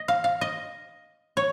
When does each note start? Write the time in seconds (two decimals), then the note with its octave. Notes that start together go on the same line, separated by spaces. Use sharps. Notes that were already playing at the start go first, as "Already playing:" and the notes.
Already playing: D#5
0.08 F5
0.24 F5
0.41 D#5
1.37 C#5